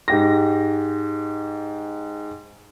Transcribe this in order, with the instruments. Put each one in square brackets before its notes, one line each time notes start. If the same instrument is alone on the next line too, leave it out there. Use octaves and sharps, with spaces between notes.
[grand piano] G#2 G4 A#6